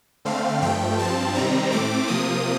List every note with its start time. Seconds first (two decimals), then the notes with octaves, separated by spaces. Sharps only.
0.25 D3 A3 C4 F5
0.62 G2 F3 A3 G5
0.98 G2 F3 C4 A5
1.35 C3 D#3 G3 C4 A#5
1.71 A2 A3 C4 D6
2.08 C3 F3 A#3 D#6